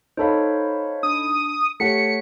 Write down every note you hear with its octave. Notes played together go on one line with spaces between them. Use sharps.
D#4 A4 C5 C#5 F5 B5
D4 D#6
A3 G4 C#5 F#5 B6 C#7